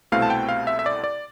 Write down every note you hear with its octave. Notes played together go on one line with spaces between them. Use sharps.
C2 B2 A3 C4 E4 F5
A5
G5
F5
E5
E5
D5
D5